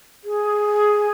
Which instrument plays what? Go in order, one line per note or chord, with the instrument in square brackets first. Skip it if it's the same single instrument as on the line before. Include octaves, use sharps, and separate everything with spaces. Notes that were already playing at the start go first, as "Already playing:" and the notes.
[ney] G#4